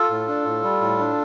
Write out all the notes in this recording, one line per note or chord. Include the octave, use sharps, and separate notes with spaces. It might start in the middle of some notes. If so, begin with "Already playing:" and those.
Already playing: F4 A4
A2
D4
A2
G3
A2
D4